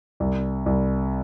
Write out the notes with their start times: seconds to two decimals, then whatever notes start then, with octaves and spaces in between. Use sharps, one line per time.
0.20 C2
0.66 C2